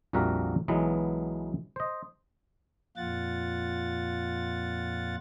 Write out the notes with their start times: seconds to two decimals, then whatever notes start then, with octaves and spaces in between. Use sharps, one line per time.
0.13 A#1 F2 G3 F#4 A#4 E5
0.68 B1 E3 F#3 G#3 B3
1.76 C5 D#5
2.97 F2 A#2 F4 F#5 A6